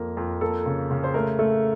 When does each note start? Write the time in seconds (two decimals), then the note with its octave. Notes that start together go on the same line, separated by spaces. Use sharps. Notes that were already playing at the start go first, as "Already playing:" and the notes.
Already playing: F2 A#3
0.17 F2
0.41 A#3 A4
0.66 C#3
0.91 C#3
1.04 C5
1.14 A3 A#4
1.39 A3 A4